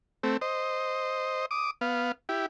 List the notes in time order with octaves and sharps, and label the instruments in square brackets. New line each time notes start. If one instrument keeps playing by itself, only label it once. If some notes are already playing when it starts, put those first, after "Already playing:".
[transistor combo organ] A3 C4
C5 D#5
D6 D#6
B3 F5
E4 G4